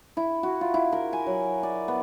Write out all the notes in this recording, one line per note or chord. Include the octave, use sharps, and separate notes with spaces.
E4
F#4
F4
E4
A#4
G#5
F#3
D5
B3